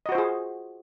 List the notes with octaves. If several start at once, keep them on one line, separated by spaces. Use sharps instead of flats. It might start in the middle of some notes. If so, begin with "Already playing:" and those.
F4 F#4 G#4 C5 D#5